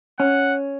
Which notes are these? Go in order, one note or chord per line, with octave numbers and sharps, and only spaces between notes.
C#4 F#5